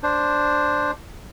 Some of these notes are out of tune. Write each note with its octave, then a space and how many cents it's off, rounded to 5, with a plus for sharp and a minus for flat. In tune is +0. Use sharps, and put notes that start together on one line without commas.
D4 +0 C5 +0